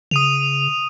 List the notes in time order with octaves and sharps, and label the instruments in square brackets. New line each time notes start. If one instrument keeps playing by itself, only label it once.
[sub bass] C#3 [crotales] D#6 D#7 F7